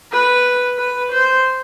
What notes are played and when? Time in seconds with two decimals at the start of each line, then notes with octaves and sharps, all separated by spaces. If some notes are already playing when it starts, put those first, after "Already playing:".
0.12 B4
0.78 B4
1.12 C5